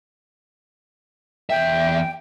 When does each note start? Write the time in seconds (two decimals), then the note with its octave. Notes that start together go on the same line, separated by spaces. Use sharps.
1.50 E2 E5 G5